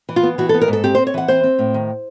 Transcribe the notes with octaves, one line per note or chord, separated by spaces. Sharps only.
E3
F4
B3
E3 F#4
B3 A4
A#4
G#2 A4
C4 G4
C4 C5
C#5
E3 F#5
C4 C5
C4
A2
D#3